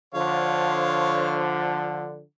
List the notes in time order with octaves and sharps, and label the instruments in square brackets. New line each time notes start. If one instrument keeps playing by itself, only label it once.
[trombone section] D3 F3 [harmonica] C5 C#5 F5